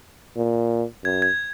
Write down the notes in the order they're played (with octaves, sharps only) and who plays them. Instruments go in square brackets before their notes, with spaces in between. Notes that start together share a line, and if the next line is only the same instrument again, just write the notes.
[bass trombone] A#2
[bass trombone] F#2 [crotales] G#6
[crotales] G#6